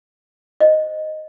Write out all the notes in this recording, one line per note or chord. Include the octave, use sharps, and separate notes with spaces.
C5 D#5